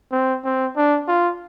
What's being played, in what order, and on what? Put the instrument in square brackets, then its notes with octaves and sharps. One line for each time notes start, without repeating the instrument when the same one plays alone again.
[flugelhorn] C4
C4
D4
F4